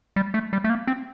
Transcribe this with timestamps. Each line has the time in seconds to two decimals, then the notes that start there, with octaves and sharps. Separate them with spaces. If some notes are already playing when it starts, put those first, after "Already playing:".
0.16 G3
0.34 A3
0.53 G3
0.64 A3
0.70 A#3
0.87 C4